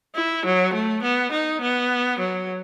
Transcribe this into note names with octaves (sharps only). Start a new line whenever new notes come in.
E4
F#3
A3
B3
D#4
B3
F#3